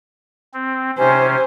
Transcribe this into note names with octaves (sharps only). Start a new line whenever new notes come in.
C4
C3 C#4 C5 G#5